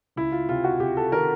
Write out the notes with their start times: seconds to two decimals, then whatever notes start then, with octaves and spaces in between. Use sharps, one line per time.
0.16 C#2 E4
0.32 F4
0.49 C3 F4
0.64 F#4
0.80 C3 G4
0.97 A4
1.12 D#3 A#4